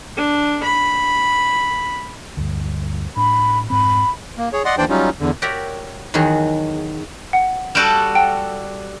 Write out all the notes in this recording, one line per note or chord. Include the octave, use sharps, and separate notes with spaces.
D4
B5
D2 G2
A2 D4 B5
F1 G#2 C4 B5
A#3
G#4 C#5
D5 D#5 F#5 C6
D#2 E3 D4 C5 D5 G5
F#3 G3 C#4 D#4 F4
E2 D3
F#4 G4 A#4 C#5 D5 E5
E2 D#3 F#3 F#4 G#4
F#5
G3 F#4 A4 G6 D7 E7
F#5 G5 A5